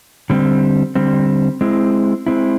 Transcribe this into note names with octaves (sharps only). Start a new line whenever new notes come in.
D3 G3 C4
D3 G3 C4
G#3 C4 E4
G#3 C4 E4